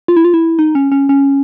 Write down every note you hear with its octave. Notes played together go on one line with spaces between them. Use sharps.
F4
E4
F4
E4
D#4
C#4
C#4
C#4